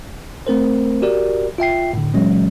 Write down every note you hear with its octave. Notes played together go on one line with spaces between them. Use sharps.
A3 C4 A#4 C5
F#4 G4 A#4 D5
F4 E5 G5 C7
A2 D3
A#2 E3 F#3 G#3 C#4